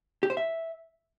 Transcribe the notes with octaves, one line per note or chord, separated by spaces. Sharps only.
G4
C5
E5